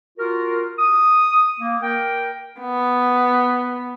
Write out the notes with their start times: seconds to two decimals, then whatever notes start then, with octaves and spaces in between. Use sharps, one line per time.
0.19 F4 F#4 A#4
0.79 D#6
1.60 A#3
1.82 A#4 G5
2.60 B3